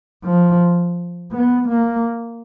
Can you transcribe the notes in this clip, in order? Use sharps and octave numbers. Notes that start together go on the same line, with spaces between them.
F3
B3
A#3